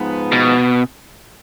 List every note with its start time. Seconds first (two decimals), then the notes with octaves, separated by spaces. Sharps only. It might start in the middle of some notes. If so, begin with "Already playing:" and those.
Already playing: G#2 F3 B3
0.32 B2